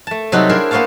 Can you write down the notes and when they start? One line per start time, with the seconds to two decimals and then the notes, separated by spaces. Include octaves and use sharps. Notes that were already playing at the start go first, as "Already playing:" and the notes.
0.07 A3 A5
0.32 C3 F#3 G3 D#4 F#4 A4
0.49 D4 E4 G#4 A#4 C5
0.71 A#3 B3 C5 C#5 F5 A5